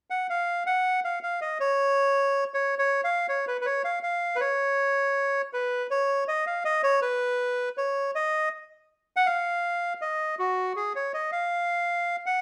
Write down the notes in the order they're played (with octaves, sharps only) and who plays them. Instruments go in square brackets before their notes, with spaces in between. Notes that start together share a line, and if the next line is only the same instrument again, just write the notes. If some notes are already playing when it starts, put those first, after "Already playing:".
[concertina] F#5
F5
F#5
F5
F5
D#5
C#5
C#5
C#5
F5
C#5
B4
B4
C#5
F5
F5
B4
C#5
B4
C#5
D#5
F5
D#5
C#5
B4
C#5
D#5
F#5
F5
D#5
F#4
G#4
C#5
D#5
F5
F#5